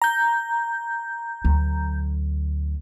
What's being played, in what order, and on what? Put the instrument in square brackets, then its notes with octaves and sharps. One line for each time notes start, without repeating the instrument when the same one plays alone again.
[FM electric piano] A#5 G6
[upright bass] D2 F#3